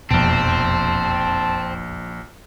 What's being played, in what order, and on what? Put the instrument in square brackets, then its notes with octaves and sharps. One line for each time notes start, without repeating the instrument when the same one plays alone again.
[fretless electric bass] E1 F2 B2 [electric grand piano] A#1 D7 [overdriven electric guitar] C4 [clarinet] A5